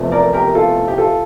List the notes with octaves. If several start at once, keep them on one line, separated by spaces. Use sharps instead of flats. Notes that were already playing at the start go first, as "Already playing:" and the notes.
Already playing: F1 E2 C3 F3 A3
A#4 D5
G4 A#4
F4 A4
G4
F4 A4